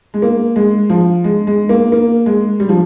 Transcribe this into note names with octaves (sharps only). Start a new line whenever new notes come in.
G#3
A#3
G#3
F3
G#3
G#3
A#3
A#3
G#3
G3
F3